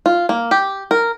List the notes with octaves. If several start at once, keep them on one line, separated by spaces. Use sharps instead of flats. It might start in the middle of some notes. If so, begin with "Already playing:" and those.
F4
A#3
G4
A#4